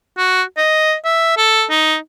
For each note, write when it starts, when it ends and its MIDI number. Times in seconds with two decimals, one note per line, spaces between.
0.18 0.42 66
0.57 0.94 75
1.05 1.37 76
1.37 1.65 69
1.70 1.96 63